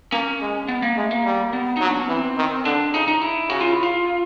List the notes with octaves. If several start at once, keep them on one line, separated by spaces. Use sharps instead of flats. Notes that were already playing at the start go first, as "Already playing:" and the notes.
A#3 C#4
G#3
B3
A#3
G#3 A3
A#3
G3
B3
F#3 D#4
D4
C#4
E3 C4
D#3
D3 D4
C#3 D#4
D#4
E4
C#3 F#4
F4
E4
F4